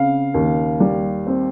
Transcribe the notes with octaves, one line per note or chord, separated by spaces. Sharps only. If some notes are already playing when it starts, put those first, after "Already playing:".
Already playing: C#3 C4 F5
D#2
G3
C4